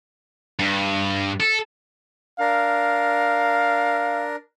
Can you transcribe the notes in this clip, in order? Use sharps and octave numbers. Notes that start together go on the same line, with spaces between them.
G2
A4
D4 A#4 F5